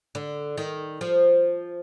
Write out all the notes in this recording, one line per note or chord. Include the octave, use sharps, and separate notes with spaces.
D3
D#3
F3